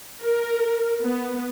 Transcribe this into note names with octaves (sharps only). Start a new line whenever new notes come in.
A#4
B3